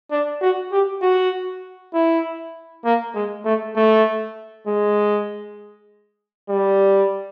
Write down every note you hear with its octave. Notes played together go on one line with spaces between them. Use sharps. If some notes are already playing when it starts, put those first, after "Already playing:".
D4
F#4
G4
F#4
E4
A#3
G#3
A3
A3
G#3
G3